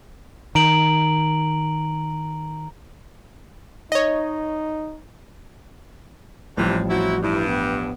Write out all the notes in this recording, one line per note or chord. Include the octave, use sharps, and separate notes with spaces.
D#3 A#5 D7 F#7
D#4 C#5 D#5
A1 A2 C3 E3 F3 G3
F#3 C4 E4 F#4
G2 E4
B3